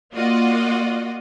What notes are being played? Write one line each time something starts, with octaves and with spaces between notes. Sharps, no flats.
A#3 F4 F#4 D5 D#5